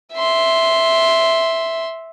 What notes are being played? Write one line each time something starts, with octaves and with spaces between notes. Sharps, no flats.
E5 C6